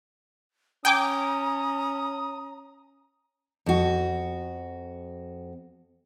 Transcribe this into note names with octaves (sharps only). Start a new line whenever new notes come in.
C#4 G5 G#5 A#5 D6 D#6
F2 F#4